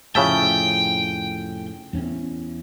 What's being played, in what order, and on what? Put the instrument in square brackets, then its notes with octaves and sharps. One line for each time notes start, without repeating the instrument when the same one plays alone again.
[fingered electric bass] F1 A2 F3 [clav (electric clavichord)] C#3 E5 A5 [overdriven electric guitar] G5
[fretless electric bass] E2 C4 C#4